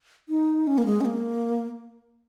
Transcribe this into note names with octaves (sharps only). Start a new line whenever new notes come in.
D#4
C#4
A#3
G#3
C#4
A#3